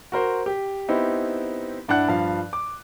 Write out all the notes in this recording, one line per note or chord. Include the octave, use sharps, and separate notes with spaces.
F#4 A#4 C5
G4
B3 C4 D#4 E4 G4
G2 D4 E4 F#5 F#6
G2 F3 F5
D6